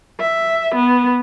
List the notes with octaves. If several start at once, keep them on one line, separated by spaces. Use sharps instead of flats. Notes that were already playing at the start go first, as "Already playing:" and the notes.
E5
B3